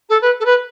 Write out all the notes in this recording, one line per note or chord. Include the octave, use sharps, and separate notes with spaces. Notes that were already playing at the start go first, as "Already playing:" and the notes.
A4
B4
A4
B4